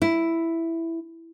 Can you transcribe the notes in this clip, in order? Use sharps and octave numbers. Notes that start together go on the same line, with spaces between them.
E4